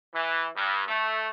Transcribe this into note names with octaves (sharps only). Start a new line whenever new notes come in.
E3
G2
A3